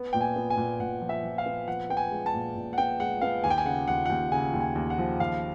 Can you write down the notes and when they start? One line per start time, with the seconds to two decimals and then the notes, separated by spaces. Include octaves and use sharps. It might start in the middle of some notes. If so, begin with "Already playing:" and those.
Already playing: B3
0.13 A#2 G5
0.21 G#5
0.36 B3
0.50 G#5
0.57 A#2
0.80 A#2 F#5
1.01 F3
1.09 E5
1.23 F3
1.38 F5
1.46 B3
1.67 F3 F#5
1.90 B3 G5
1.97 G#5
2.11 G#3
2.26 A5
2.34 A#2
2.55 A#2
2.73 F#5
2.78 B3 G5
3.00 G#3 F#5
3.21 B3 F5
3.44 D#2 G#5
3.50 G5
3.58 G#5
3.65 C#3 F#5
3.87 D#2 F#5
4.05 F#5
4.10 D#2 G5
4.32 C#3 G#5
4.54 D#2
4.61 G#5
4.75 D#2
4.90 F#5
4.98 F3
5.20 D#2 F5